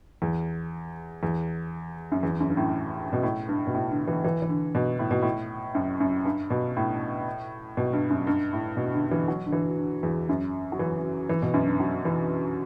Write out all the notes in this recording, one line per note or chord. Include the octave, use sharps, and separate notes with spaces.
E2
E2
F#2
E2
F#2
G2
A2
B2
A2
G2
B2
A2
D3
E3
E3
E3
D3
B2
A2
B2
A2
F#2
F#2
G2
B2
A2
B2
G2
F#2
G2
A2
B2
D3
D3
E3
F#3
D3
E3
D3
E2
F#2
F#3
E3
E3
B2
F#2
G2
F#3
E3